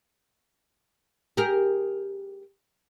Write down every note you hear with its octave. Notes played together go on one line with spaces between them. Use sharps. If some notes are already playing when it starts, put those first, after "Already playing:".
G4 G#4 A#4